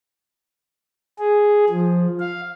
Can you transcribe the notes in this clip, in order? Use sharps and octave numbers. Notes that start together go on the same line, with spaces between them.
G#4
F3
F5